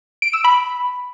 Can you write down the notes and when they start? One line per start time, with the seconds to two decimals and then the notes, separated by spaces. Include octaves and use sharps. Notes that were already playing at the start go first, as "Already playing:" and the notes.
0.22 D7
0.33 E6
0.44 B5